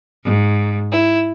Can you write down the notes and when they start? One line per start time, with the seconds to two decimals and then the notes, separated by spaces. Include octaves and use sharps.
0.24 G#2
0.92 E4